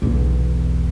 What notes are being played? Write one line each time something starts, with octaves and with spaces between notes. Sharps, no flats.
B1 E2